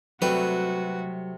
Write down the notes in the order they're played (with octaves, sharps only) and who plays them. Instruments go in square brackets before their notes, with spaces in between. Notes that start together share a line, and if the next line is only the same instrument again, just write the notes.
[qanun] C3 G3 A3 [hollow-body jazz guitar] F#3 [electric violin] F#4 [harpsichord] B4